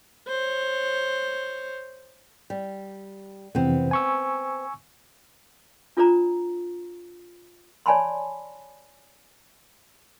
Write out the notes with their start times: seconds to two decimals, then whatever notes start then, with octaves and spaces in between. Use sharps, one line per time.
0.28 C5 C#5
2.50 G3
3.55 F2 C3 E3 B3 C4
3.91 G#5 C#6 E6
5.97 D4 F4 A4 C5 D5 A#5
7.86 C#5 D5 G#5 A5 B5 C6